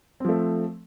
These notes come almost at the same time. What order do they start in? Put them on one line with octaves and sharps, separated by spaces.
C4 F3 A3